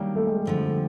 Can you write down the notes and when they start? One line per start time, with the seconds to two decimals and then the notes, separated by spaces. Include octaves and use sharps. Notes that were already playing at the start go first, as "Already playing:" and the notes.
Already playing: D#3 F#3 G3 A#3 D4 G4
0.16 A3
0.27 G#3
0.37 A3
0.45 F2 D3 F3